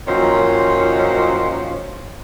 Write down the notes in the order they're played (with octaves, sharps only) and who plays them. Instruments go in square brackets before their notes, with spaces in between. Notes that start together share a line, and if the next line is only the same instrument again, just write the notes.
[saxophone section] F#2 A#2 D#3 F3 C5 C#5